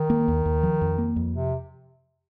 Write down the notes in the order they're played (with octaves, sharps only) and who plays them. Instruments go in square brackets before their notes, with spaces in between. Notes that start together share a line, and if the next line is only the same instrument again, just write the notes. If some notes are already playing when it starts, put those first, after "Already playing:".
Already playing: [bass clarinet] D#3
[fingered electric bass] A#3
D#2
D#2
F3
F2
A#3
F2
[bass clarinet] C3